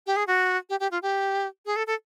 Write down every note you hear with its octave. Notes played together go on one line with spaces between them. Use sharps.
G4
G#4
F#4
G4
G4
F4
G4
G#4
A4
A4